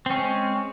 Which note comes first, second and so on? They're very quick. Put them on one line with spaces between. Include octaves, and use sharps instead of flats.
C4 C#4 G#3